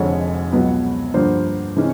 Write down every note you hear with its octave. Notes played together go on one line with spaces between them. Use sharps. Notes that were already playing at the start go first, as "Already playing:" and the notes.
Already playing: F1 F2 D3 F3 G#3 C#5
C#2 B2 F#3 B3
G2 D3 F3 A#3 D4 C5
C3 E3 G#3 C#4